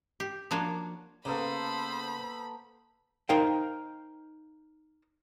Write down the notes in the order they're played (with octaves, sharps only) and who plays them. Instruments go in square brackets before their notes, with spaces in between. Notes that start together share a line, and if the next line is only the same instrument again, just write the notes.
[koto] G4
F3 A#3 D4 F#4 C#5
[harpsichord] C#3 [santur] A#3 B3 A4 [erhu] C5 [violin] B5
[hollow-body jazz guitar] D#4 A#4 C5 F5 G5